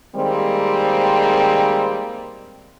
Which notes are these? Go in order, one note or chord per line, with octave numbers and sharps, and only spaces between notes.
D#3 G3 G#3 A#3 C4